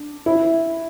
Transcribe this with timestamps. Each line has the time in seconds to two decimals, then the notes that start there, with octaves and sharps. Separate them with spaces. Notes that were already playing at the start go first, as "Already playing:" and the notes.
Already playing: D4
0.26 E4